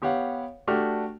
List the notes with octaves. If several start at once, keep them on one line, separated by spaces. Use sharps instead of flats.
B3 G4 C#5 F5 F#5
A3 D4 F#4 G4 F6